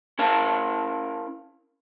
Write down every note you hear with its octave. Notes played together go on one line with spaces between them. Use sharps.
C#4 E4 A#4 F5 A5